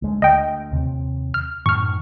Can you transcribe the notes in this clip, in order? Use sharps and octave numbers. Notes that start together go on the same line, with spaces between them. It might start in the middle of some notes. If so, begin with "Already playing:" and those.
D2 G#3
D2 D#5 G5
D#2 C3
F6
F#2 A2 D#3 C#6 F6